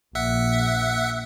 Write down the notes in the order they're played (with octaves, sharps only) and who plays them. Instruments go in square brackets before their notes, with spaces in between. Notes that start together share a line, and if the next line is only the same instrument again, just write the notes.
[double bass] A#1 [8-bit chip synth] E5 F#5